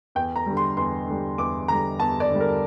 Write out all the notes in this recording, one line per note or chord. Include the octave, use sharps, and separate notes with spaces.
E2 G5
A#5
D3 G3
C6
E2 C6
D3 G3
E2 D6
D3 G3 A#5
E2 A5
D5
D3 G3
A#4